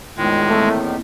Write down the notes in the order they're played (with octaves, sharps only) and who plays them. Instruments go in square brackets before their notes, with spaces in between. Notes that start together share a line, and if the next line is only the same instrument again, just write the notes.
[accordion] E2 A2 D#3 [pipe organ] G#3 [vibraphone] F4 G5
[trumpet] A3 [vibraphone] A#3 C4 E4